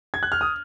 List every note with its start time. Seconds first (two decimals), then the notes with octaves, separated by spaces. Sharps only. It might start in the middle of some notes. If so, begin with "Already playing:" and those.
0.14 G#6
0.23 F#6
0.32 F6
0.41 D#6